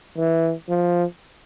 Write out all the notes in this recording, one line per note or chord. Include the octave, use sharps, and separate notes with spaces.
E3
F3